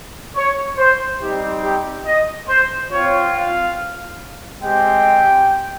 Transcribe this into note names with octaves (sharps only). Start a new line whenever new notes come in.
C#5
C5
G3 C4 D#4 G4
G4
D#5
C5
C4 F4 C#5
F5
G#3 C4 G4 G5